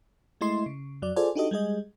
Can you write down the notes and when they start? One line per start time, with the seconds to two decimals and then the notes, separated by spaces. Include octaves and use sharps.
0.41 G#3 A3 E4 D#5 C6 C7
0.66 C#3
1.02 F2 F#3 D5
1.16 F4 G#4 A4 C5 D5 G#5
1.35 D4 D#4 F#4 G4 A4 D#5
1.51 G3 G#3 G#4 D#5